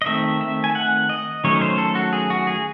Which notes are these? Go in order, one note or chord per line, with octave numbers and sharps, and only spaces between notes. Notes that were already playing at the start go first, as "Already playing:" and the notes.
D#5
D#3 A3 C4 E5
E5
G#5
F#5
D#5
D#3 F#3 A3 C#4 C#5
C5
A4
F#4
G#4
F#4
G#4